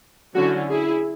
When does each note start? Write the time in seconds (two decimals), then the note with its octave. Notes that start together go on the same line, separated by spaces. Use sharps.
0.34 D3 F#3 C#4 E4 F#4
0.69 E4 G#4